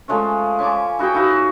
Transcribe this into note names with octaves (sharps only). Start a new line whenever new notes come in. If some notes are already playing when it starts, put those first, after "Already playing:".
F3 G#3 A3 C#4
C#4 G#5 A5 D6
E4 F#4 G#4 G5
A#2 D#4 E4 F#4